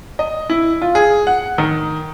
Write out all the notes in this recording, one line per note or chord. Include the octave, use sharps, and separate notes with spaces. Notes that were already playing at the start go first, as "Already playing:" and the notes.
D#5
E4
F4
G#4
F#5
D#3